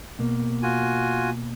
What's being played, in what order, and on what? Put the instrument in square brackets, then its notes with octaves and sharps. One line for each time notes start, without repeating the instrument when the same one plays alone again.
[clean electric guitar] B2 A#3
[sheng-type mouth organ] F4 F#4 G#5